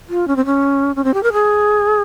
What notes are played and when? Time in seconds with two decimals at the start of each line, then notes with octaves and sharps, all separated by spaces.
0.09 F4
0.28 C#4
0.36 C4
0.45 C#4
0.96 C#4
1.04 C4
1.14 G4
1.23 A#4
1.33 G#4